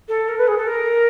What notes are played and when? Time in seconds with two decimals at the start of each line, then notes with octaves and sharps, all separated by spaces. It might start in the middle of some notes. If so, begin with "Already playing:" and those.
0.08 A4
0.28 A#4
0.38 B4
0.47 G#4
0.57 A4
0.67 A#4